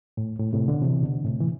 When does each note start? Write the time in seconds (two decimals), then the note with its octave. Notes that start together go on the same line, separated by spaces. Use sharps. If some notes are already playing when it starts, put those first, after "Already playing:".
0.17 A2
0.39 A2
0.53 A2 C3
0.68 B2 D3
0.82 C3 E3
1.03 B2 D3
1.24 A2 C3
1.40 E3